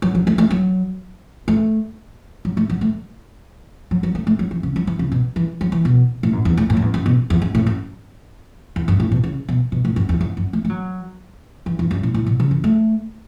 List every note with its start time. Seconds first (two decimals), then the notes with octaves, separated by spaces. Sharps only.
0.02 F#3
0.15 F#3
0.27 A3
0.38 A3
0.50 F#3
1.48 A3
2.45 F#3
2.57 A3
2.70 F#3
2.81 A3
3.91 F#3
4.03 F#3
4.15 A3
4.27 A3
4.39 F#3
4.51 E3
4.63 C#3
4.76 F#3
4.87 E3
4.99 C#3
5.12 B2
5.36 E3
5.61 F#3
5.72 E3
5.85 B2
6.23 A2
6.33 F#2
6.45 E2
6.57 A2
6.70 A2
6.77 F#2
6.82 E2
6.94 F#2
7.06 B2
7.30 E2
7.42 F#2
7.55 A2
7.67 F#2
8.76 E2
8.88 F#2
9.00 A2
9.12 B2
9.24 C#3
9.49 B2
9.72 B2
9.85 A2
9.96 F#2
10.09 E2
10.21 F#2
10.37 F#2
10.53 A3
10.65 A3
10.70 F#3
11.66 E3
11.79 E2
11.91 F#2
12.03 A2
12.14 A2
12.27 B2
12.40 C#3
12.51 E3
12.64 A3